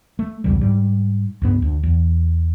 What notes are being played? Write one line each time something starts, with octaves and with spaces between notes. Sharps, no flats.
A3
B1 E2 C#3 G3
G#2 G3
C#2 G2 B3
D2
E2